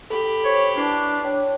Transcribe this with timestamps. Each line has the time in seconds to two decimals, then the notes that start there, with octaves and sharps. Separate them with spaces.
0.10 G4 A4 B5
0.45 C5 C#5
0.78 D4 E4 B4 C7
1.25 C#5 G5